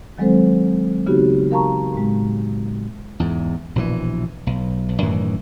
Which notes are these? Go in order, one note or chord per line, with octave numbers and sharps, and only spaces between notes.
D#3 F#3 G#3 C4 A4 C5
C#3 B3 D#4 F#4 G4
A#4 F5 A5 A#5 C#6
A2 G#3
E2 G#2
A#1 B2 D3 E3
B1
B1
F#2 A2 D#3 E3